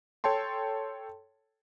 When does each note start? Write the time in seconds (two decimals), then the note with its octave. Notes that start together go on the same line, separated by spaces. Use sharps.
0.24 A4 C#5 G5 A5 C6